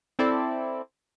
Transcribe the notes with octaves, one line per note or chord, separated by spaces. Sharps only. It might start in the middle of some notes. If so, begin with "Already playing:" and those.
C4 E4 A4 D5